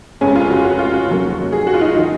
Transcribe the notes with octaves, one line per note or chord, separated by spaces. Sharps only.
F1 F2 C#3 G#3 C#4
F4
F#4
F#4
F4
F#4
F1 D#2 D#3 F#3 A#3
G#4
F#4
F4
D#4
D#3 D#4